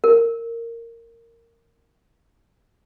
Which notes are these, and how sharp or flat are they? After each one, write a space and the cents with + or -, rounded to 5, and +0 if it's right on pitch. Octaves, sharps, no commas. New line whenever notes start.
A#4 -15